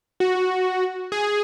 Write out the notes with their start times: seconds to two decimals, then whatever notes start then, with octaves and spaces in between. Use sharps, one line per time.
0.20 F#4
1.12 G#4